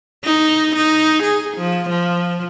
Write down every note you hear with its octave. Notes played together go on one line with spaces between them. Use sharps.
D#4
D#4
G#4
F3
F3